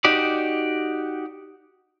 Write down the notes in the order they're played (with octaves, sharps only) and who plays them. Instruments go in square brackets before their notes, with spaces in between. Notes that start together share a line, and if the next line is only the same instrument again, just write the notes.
[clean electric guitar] D#4 F#4 G4 D5